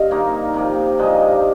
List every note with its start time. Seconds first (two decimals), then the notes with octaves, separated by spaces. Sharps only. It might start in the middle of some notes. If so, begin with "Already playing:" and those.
Already playing: G2 C4 D#5 F5
0.11 D#3 A#3 D#4
0.54 C3 F3 A#3
0.99 G2 F3 G#3 D#4 D#5
1.22 G4